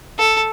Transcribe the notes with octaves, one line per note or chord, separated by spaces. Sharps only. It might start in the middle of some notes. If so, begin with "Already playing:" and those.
A4